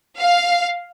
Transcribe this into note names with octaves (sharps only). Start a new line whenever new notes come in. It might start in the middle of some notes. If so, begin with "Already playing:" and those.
F5